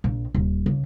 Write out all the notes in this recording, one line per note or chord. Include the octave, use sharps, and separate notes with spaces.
A#1
D#1
C#2